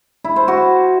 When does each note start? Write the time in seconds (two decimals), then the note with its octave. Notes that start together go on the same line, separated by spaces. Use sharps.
0.24 E4
0.36 C5
0.48 F#4